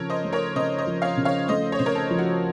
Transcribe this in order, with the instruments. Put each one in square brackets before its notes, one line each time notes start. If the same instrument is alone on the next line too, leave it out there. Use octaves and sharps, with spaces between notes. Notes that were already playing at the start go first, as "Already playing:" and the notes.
Already playing: [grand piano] C#3 F3 [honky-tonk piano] A4 A#4 C#5
[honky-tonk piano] C5 D#5
[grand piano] A3
[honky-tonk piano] A#4 C#5
[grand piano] C#3 [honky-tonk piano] C5 D#5
[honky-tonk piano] C5 D#5
[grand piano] F3
[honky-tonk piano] C#5 F5
[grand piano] C#3
[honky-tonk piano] C#5 F5
[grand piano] A3 [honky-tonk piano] C5 D#5
[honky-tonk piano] C#5
[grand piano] C#3 [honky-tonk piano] C5
[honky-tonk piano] A#4 C#5
A4
[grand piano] F3
[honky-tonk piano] F#4